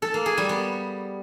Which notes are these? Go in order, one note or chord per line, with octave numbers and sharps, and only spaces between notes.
A4
A#3
G#4
G3
B3